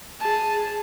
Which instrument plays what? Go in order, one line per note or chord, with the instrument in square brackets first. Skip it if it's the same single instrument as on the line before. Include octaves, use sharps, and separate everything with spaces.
[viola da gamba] G#4 [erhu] A5